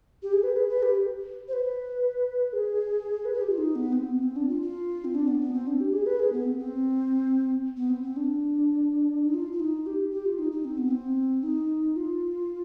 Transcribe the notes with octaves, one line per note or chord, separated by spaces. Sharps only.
G4
G#4
B4
G#4
B4
G4
C5
B4
G#4
B4
G#4
G4
F4
D#4
B3
C4
B3
C4
D4
F4
F4
C4
D4
B3
B3
C4
D4
G4
G#4
B4
G#4
B3
C4
C4
B3
C4
C4
D4
D#4
F4
F4
D#4
G4
G4
F4
D#4
D#4
C4
B3
C4
D#4
F4